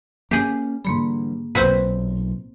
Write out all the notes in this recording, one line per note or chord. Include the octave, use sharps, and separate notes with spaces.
A#3 C#4 G4 G#4
G#2 D3 E3 G3 A#3 B5
B1 A#2 C4 F#4 B4